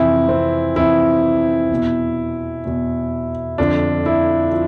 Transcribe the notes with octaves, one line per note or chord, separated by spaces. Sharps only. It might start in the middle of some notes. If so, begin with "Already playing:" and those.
Already playing: F2 C3 E3 E4
C4
F2 C3 E3 E4
E2 B2
E2 B2
F2 D3 F3 D4
E4
F3